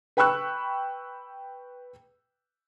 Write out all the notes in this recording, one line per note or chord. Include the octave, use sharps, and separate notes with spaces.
B4 G5 B5 C#6 E6 F#6